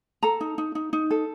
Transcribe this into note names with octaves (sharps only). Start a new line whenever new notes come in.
A4 A#5
D#4
D#4
D#4
D#4
A4